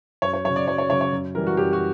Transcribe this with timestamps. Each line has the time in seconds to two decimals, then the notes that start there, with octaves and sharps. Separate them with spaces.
0.22 F#2 C#5
0.33 C#5
0.45 C#3 F#3 C#5
0.56 D5
0.67 F#2 C#5
0.78 C#5
0.90 C#3 F#3 C#5
1.01 C#5
1.12 F#2
1.35 E3 G3 A#4
1.47 F#4
1.57 F#2 G4
1.73 F#4